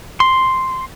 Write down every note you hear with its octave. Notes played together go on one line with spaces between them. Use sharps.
C6